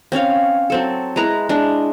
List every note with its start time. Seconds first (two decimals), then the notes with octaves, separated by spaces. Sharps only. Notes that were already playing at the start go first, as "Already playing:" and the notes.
0.12 C4 C#4 C#5 F5
0.70 F#3 C4 A4
1.16 G#3 E4 B4 A#5
1.49 G#3 D4